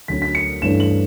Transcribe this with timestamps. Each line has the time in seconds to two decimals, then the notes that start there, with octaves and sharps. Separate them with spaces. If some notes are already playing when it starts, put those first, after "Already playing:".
0.08 D2 D3 F#3 C#4 B6
0.22 B6
0.35 C#7
0.62 G2 E3 A3 C#4 E7
0.80 F#7